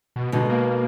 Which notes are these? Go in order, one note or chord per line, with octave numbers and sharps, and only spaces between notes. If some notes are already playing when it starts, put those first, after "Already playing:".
B2
B2 D3 G#3 D#4
A#3